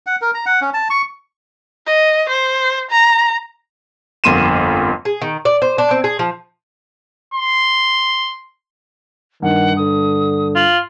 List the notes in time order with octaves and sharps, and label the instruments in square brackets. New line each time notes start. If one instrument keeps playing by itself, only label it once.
[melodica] F#5
A#4
A#5
F#5
C#4
A5
C#6
[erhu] D#5
C5
A#5
[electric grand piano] G1 F2 A#3 C6 D#7 E7
[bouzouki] G#4
D#3
D5
C5
D4
C4
G#4
F3
[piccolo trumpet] C6
[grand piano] G2 [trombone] D#3 [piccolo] F#5
[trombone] D3 [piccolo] D#6
[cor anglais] F4 [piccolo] F#7